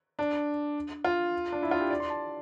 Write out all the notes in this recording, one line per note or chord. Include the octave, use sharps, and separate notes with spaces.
D4
F4
D4
E4
F4
G4
D5
C6
A5